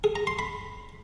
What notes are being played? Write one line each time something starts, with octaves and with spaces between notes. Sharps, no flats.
G#4
A#5
C6
B5